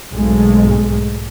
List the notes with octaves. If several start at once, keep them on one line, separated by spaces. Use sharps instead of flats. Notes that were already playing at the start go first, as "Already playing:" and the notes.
B1 G#2 G#3 A3